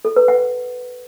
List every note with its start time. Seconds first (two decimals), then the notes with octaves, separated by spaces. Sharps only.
0.05 A4
0.16 B4
0.28 F#5